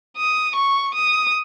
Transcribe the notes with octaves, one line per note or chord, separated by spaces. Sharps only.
D#6
C#6
D#6